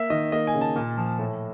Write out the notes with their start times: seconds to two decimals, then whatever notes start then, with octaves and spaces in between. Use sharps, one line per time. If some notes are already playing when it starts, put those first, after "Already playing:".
Already playing: A#3 E5
0.10 D#3 D#5
0.32 A#3 D#5
0.47 G#5
0.54 C#3
0.61 A5
0.76 A#2
0.98 F3
1.19 A2